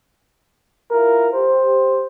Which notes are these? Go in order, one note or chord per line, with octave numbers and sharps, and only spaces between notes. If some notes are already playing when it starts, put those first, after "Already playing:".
E4 F4 A#4
G4 C5